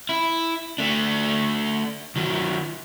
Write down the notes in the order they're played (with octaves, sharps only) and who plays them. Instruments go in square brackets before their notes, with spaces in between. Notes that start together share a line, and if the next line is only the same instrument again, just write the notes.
[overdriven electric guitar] E4
A3 D4
D#3 F#3